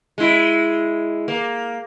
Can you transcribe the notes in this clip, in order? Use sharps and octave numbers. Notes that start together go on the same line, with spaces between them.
G#3 E4
A#3